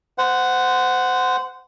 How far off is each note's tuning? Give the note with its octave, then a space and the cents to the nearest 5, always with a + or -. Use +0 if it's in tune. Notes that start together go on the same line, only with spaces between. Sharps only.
C5 -20 F#5 +0